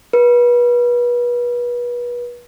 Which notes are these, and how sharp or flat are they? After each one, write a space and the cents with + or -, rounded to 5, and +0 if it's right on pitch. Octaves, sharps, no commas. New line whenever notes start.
B4 -30